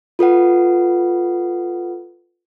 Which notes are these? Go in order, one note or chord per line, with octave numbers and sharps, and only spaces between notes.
F4 A4 B4 F#5